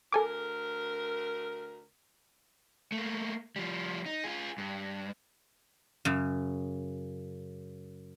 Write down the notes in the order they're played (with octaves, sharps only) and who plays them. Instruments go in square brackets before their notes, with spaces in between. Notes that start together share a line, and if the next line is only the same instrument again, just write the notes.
[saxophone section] D2 A#4 [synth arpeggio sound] A4 G#5 D6
[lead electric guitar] A3 A#3
F3 G3
D#4
F4 G#4
G2
[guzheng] F#2 C#3